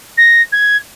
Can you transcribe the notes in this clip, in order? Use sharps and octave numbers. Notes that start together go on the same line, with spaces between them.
A#6
G#6